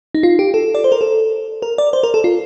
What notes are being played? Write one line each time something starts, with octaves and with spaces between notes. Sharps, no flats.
D#4
F4
G4
A4
D5
C5
A#4
A4
A#4
D5
C5
A#4
A4
F4